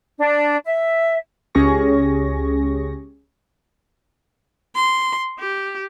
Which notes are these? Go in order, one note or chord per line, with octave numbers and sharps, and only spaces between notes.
D4
E5
C#2 C#4 G4 G#4 C#6 A#6
C6
G4